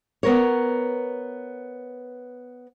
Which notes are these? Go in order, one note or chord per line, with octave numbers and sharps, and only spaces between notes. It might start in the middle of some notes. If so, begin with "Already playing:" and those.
B3 A#4 C#5